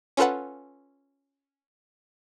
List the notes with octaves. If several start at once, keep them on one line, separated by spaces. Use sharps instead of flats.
C#4 F4 A4 B4 F#5